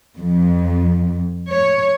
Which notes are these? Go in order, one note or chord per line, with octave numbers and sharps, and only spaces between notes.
F2
C#5